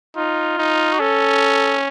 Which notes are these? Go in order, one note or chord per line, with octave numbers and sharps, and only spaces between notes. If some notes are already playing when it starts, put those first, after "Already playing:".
D#4 F4
D#4
F#4
C#4 A4